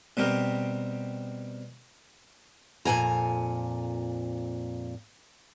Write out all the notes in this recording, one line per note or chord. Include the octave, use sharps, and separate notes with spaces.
B2 G3 C4 G4 A#4
F2 A#2 G#5 A#5